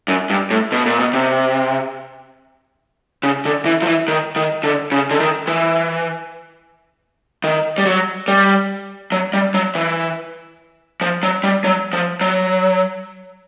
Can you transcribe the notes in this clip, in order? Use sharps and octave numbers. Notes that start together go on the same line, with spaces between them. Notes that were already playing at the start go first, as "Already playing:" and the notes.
F#2
G2
A2
B2
A#2
B2
C3
C#3
D3
E3
F3
E3
D#3
D#3
D3
C#3
D3
D#3
E3
D#3
G3
F#3
G3
F#3
G3
F#3
E3
F3
F#3
G3
F#3
F3
F#3